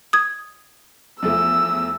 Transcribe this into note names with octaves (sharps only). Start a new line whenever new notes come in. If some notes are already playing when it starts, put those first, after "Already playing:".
D#6 G#6
E2 F3 A3 E6